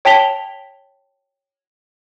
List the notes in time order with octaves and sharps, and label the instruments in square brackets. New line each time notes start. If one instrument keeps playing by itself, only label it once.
[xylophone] C#5 G5 A5 B6 F7 G7